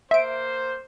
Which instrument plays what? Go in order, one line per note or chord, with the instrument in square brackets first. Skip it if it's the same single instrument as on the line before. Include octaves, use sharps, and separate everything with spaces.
[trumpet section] A#3 C5 [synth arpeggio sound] E5 D7